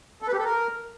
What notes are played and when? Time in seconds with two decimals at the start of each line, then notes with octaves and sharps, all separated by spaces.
0.22 A4
0.28 B4
0.33 G4
0.39 A4
0.44 A#4